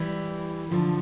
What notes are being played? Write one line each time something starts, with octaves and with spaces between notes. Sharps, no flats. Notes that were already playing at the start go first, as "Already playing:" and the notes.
Already playing: E3 G3
D3 F3